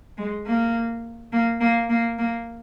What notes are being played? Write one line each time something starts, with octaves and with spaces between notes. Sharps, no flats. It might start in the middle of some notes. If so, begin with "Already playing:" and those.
G#3
A#3
A#3
A#3
A#3
A#3